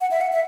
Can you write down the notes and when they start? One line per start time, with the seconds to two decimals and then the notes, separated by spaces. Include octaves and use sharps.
0.01 F#5
0.11 E5
0.21 F#5
0.32 E5